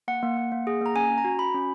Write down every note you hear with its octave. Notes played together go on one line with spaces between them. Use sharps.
A#3 F#5
A#3
A#3
A#3
G#4
A#3 A#5
C#4 G#5
C#4
A#5
F#4
F#4 B5
C#4